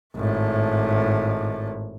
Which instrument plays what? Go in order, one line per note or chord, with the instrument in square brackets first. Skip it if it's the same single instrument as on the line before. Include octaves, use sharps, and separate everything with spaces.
[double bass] G#1 A2